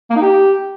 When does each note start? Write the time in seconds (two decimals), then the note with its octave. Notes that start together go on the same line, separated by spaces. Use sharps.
0.10 A#3
0.16 D#4
0.21 G4